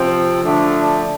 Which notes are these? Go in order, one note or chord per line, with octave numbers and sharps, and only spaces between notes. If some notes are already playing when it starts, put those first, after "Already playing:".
Already playing: C3 F3 C4
D3 F3 A3 D4